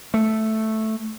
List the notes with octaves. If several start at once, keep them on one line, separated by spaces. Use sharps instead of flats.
A3